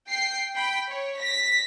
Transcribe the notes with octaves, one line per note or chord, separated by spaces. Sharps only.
G5 C7
G5 B5
C#5
A#6 B6